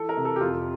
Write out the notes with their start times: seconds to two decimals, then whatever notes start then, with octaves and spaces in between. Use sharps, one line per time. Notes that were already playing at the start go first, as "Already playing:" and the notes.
Already playing: E3 A4
0.09 A#4
0.17 C3
0.25 A4
0.36 G4
0.41 F2 F4